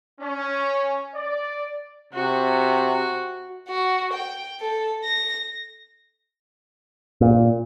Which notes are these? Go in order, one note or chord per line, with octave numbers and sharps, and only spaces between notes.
C#4
D5
C3 F#4
F#4
G5
A4
A#6
A#2